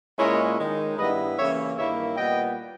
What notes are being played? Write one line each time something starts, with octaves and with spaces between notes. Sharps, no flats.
A#2 G#3 C#4 E4 A#4 C#5
D#3 G#3 D#4
G2 G3 B3 E4 B4 D#5
C#3 E3 A#3 C#4 C#5 E5
G2 D#3 A#3 E4 C#5 E5
A#2 G3 B3 D#5 G5